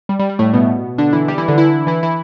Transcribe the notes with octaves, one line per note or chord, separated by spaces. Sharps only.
G3
G3
G3
A2 A3
B2 B3
D3 D4
E3 E4
G3 G4
E3 E4
D3 D4
E3 E4
E3 E4
E3 E4